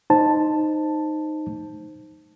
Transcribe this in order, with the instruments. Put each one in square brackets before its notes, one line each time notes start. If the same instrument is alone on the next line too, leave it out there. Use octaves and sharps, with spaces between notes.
[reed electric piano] D#4 C5 A5